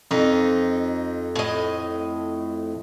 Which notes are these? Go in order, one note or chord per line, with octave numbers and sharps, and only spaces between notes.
F2 D#4
A2 D#5